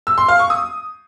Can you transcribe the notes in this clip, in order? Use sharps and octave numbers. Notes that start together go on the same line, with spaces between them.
E6
C6
F5
C#6
D#6